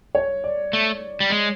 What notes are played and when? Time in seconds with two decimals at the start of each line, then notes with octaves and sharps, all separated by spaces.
0.15 C#5
0.44 D5
0.73 A3
1.20 G3
1.30 G#3